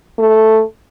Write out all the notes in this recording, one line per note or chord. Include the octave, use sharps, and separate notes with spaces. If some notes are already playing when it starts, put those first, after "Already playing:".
A3